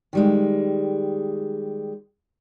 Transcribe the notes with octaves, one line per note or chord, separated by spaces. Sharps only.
D#3 G3 G#3